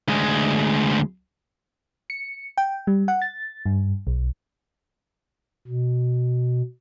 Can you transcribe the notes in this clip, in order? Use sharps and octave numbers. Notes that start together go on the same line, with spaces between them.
D2 G#3
C#7
G5
G3
F#5
A6
G2
B1
B2